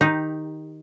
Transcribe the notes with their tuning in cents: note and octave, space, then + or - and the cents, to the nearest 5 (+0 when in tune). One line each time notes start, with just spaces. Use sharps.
D#3 +0 D#4 +0 G4 +0